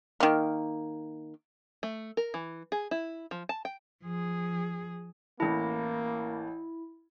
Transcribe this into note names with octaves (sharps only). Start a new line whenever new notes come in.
D#3 A#3
A3
A#4
E3
G#4
E4
F3
A5
G5
F3 G#4
A1 E3 A#3 E4 A5